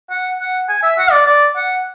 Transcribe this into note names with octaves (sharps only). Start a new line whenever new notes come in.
F#5
F#5
G#5
E5
F#5
D5
D5
F#5